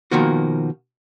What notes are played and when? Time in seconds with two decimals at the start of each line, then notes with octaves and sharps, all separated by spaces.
0.11 B2 D#3 F3 A#3 F#4